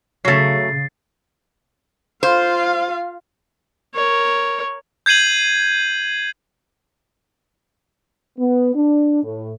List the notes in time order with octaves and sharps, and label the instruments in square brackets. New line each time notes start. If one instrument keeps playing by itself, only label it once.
[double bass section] C#3 [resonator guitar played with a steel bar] F#3 A3 [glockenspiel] A6 C7
[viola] F4 F5 [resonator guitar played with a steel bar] C5
[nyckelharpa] A#4 C#5
[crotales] G6 G#6 C7 D#7 F#7
[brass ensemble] B3
D4
A2